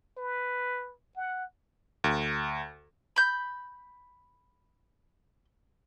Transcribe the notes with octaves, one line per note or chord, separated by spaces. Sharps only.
B4
F#5
D2
B5 G6